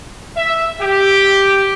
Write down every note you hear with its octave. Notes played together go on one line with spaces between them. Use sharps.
E5
G4